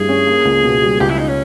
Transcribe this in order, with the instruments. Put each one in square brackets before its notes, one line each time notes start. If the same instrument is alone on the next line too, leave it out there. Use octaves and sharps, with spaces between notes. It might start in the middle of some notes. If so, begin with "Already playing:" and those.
Already playing: [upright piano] G2 G3 E4 [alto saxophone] G#4
[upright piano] C#4
A#3
C#2
B2
G3
[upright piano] C#2 [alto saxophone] G4
[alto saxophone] E4
D#4
C#4